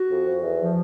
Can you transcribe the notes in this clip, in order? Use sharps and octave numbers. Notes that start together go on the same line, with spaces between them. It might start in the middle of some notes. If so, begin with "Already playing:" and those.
Already playing: F#4
F2
F2
E2
F3